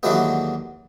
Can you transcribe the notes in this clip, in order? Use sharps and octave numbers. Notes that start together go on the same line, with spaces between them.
D#2 D3 E3 F#3 G#3 B3